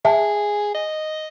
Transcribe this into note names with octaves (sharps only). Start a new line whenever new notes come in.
G#4 E5 A5
D#5